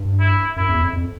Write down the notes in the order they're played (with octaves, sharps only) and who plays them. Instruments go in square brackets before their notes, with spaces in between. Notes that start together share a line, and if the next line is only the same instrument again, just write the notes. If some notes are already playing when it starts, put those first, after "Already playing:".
Already playing: [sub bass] G2
[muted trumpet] E4
[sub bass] F#2 [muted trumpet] E4
[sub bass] E2
F2
F2